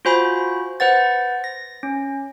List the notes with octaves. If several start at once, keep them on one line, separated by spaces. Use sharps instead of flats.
F4 F#4 C5 G#5 B5
B4 C5 F#5 A6
A#6
C#4